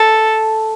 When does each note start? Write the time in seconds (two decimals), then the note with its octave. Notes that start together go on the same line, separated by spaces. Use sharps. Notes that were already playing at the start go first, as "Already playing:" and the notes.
Already playing: A4